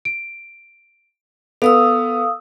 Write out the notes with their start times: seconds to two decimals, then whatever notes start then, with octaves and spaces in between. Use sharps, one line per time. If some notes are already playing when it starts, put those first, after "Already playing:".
0.05 D7
1.62 B3 A4 F5 D#6 E6